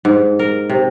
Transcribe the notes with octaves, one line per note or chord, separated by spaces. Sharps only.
G#2
A#4
C3